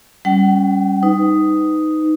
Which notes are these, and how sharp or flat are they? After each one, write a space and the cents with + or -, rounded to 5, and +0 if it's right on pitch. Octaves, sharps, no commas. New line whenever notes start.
G3 +0 C#4 +0 F#5 +45
D#4 +0 B4 +30